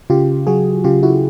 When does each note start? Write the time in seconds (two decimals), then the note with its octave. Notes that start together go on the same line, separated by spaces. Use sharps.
0.10 C#3 F4 G4
0.47 F#3 F#4 G#4
0.84 C#3 F4 G4
1.03 E4 F#4